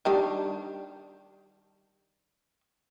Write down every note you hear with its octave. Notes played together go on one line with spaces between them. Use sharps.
D#3 G3 D4